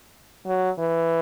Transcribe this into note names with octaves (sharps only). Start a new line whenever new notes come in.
F#3
E3